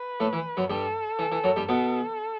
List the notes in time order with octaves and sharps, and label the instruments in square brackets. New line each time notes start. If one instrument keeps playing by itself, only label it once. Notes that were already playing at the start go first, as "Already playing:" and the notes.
Already playing: [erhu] B4
[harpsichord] A2 A3
E3
F#2 F#3
[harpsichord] G2 G3 [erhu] A4
[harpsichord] E3
E3
F#2 F#3
G2 G3
[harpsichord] B2 B3 [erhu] A4